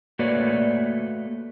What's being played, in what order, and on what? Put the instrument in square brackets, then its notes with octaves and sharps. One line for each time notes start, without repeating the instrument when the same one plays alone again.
[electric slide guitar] A3 A#3 F#4 B4 C#5 D5